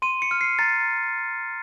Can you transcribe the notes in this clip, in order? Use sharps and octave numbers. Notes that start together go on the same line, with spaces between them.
C6 D#7
C#7
F6
C7
A#5 A6